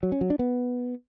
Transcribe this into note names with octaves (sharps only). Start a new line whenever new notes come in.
F#3
C#4
F#3
D4
B3